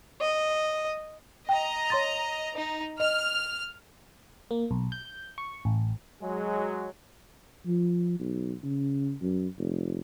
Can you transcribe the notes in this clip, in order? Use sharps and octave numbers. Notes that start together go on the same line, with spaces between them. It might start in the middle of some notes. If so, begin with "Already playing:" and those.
D#5
D#5 G5 A#5
C#5 C6 A6
D#4
D#5 F6
A#3
B1
G6
C#6
A1
F#3 G#3
F3
B1
C#3
F#2
F1